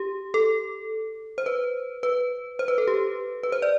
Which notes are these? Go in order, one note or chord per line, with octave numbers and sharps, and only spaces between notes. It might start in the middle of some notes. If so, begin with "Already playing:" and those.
Already playing: G4
A4
C5
B4
B4
C5
B4
A4
G4
B4
C5
D5